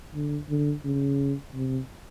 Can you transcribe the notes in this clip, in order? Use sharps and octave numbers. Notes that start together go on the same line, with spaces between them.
D3
D3
C#3
C3